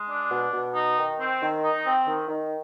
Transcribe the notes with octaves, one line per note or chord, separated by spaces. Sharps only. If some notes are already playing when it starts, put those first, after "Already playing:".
Already playing: G#3
D4
B2
B2
D#4
D#3
C4
D#3
D#4
C4
D#3
D#3